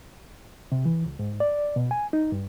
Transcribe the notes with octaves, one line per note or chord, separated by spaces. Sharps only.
C3
E3
C#2
G#2
D5
B2
G#5
D#4
G2